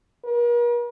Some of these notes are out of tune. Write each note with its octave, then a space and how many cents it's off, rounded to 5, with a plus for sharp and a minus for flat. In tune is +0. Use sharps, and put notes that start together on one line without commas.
A#4 +45